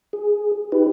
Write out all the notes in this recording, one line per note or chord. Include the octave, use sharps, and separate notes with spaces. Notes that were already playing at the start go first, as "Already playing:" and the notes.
G#4
D#4 G4 B4